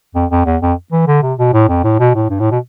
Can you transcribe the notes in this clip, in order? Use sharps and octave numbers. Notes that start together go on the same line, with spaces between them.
F2
F2
E2
F2
E3
D3
C3
B2
A2
F2
A2
B2
A2
G2
A2
B2